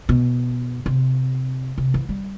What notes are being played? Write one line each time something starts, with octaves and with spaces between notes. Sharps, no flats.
B2
C3
C3
E3
G3